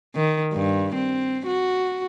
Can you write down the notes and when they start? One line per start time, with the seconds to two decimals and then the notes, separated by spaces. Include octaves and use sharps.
0.16 D#3
0.53 G2
0.94 C4
1.47 F#4